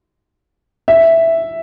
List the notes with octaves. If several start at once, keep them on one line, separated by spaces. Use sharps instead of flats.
E5